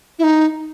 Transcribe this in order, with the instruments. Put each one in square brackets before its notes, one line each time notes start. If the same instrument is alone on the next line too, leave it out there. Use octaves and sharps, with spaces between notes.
[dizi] E4
D#4